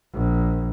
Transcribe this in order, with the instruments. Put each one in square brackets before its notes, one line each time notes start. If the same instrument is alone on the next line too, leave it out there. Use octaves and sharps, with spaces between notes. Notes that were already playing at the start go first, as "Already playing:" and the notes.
[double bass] A#1